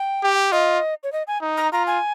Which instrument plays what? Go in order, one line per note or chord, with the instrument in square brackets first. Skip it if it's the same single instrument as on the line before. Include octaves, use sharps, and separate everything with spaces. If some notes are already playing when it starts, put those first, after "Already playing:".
Already playing: [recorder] G5
[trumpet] G4
[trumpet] F4 [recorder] D#5
[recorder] C#5
D#5
G#5
[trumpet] D#4
[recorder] A#5
[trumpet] F4 [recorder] A#5
[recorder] G#5